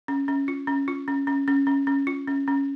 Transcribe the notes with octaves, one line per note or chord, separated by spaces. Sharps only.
C#4
C#4
F4
C#4
F4
C#4
C#4
C#4
C#4
C#4
F4
C#4
C#4